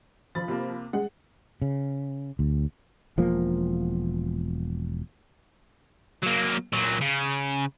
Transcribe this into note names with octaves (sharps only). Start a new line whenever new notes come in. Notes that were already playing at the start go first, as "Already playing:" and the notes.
F3 F4 B5 A6
C3 A#3
G#3 F#5
C#3
D2
E1 F3 A#3
F#3 A#3
A#2 F#3
C#3